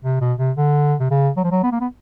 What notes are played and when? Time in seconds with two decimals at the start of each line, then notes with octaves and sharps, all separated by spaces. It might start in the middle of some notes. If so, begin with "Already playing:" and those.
0.05 C3
0.21 B2
0.39 C3
0.57 D3
1.00 C3
1.11 C#3
1.37 F#3
1.44 F3
1.51 F#3
1.63 B3
1.72 A#3
1.80 B3